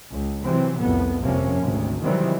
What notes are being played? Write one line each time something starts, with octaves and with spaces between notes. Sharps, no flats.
C#2
C3 E3 F#3 C4
C2 F2 A2 B3
G1 F2 C3 F3 A#3 C#4
G#1 D2 C3
C3 D#3 E3 F#3 G3 C4